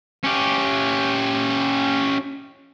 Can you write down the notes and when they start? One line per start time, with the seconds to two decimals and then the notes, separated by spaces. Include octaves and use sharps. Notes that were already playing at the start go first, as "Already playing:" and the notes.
0.24 C#4 G4